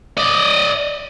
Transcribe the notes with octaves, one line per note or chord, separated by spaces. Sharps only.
D5 D#5